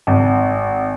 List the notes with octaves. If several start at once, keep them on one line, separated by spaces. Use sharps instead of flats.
G#1